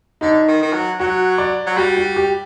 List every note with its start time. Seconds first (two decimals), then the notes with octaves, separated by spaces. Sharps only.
0.21 D3 D#4
0.48 D#3
0.62 D#3
0.73 F#3
1.00 F#3 F#4
1.38 D5
1.66 F#3
1.77 G3 F#4
1.97 F#4
2.16 G4